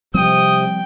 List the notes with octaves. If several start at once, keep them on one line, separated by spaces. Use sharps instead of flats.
C3 F3 G3 C4 G5 D#6